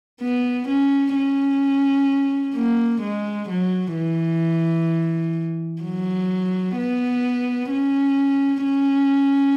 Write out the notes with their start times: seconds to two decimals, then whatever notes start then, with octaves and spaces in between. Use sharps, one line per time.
0.21 B3
0.68 C#4
1.15 C#4
2.55 A#3
3.02 G#3
3.49 F#3
3.95 E3
5.82 F#3
6.76 B3
7.70 C#4
8.64 C#4